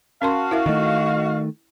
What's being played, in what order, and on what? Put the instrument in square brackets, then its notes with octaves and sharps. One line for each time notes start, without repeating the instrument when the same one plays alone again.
[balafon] C#4 A#4 C6 [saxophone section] F#4 F5 [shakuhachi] A5
[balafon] E4 A#4 E5
[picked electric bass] D#3 A3 [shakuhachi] D#5